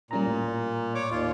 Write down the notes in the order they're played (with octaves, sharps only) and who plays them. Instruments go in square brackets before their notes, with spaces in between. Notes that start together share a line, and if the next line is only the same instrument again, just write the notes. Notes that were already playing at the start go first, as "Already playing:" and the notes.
[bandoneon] A#2 [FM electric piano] G3 C#4 A#5
[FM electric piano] A2
[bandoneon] C#5 D6
[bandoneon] D#2 F4 [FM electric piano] D5